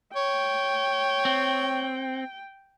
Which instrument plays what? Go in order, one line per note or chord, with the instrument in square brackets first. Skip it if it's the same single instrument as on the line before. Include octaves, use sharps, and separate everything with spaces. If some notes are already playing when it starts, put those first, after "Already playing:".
[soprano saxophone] C#5 [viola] G5
[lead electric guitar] C4